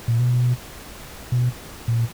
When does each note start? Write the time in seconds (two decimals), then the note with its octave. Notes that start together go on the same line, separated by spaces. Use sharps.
0.08 A#2
0.20 B2
1.32 B2
1.88 A#2